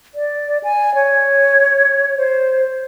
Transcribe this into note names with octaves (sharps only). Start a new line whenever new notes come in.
D5
G#5
C#5
C5